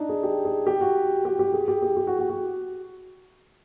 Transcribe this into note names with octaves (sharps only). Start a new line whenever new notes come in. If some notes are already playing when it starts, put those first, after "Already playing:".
Already playing: D4 D#4
G#4
G4
G#4
G4
F#4
G4
G4
G#4
G4
G4
G4
F#4
F#4
F#4